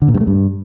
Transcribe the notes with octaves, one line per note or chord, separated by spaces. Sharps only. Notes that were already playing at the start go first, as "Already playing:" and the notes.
D3
A#2
G2
A3
G2